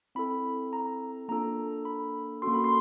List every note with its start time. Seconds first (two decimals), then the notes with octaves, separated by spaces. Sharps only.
0.15 C4 E4 A4 B5
0.73 A#5
1.28 A#3 D4 F4 A4 A#5
1.85 B5
2.42 A#3 C#4 F#4 A4 C6
2.54 B5
2.64 C6